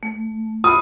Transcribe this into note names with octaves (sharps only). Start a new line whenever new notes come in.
A3
F4 B5 D#6